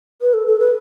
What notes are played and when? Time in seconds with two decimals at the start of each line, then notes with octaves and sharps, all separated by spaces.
0.21 B4
0.34 A4
0.47 A4
0.60 B4